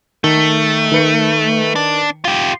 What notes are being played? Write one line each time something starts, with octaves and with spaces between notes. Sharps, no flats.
D#3 A3
D#3 B4 C#7
D4
F4 G4